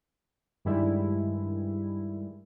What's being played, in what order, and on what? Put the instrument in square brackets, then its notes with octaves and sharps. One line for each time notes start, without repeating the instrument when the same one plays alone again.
[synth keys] G2 D#3 G3 G#3 E4